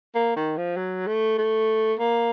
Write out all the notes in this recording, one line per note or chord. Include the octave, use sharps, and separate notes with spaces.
A#3
D#3
F3
F#3
A3
A3
A#3